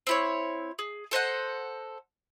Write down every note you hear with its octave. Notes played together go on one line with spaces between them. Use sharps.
C4 E4 C#5
G#4
A4 C5 D#5 F#5